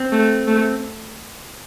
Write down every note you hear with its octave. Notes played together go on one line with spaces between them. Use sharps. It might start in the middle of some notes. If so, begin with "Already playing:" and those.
Already playing: C4
A3
A3